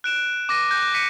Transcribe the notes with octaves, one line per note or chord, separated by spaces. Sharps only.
F#6 D7 E7
D6 A#6 D#7
F#6 G6 A#6
G6 B6 C#7 D#7